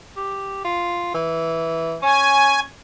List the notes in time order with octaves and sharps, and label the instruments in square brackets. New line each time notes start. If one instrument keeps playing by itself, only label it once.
[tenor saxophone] G4
F4
E3
[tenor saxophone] C#4 [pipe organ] G#5